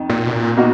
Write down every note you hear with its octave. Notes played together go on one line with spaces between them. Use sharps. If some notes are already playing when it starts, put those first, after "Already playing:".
Already playing: F2 D#3
A#2
B2
A#2
B2 A#3 D#4 F#4